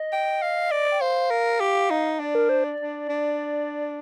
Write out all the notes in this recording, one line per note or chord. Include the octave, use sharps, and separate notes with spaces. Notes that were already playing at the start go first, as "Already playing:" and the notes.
Already playing: D#5
G5
F5
D5
G5
C5 F5
A#4
G4
D#4
D4 D5
A#4
C5
D5
D4
D4